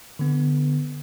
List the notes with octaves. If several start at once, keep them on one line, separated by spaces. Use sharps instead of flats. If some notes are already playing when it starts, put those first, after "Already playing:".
D3 B3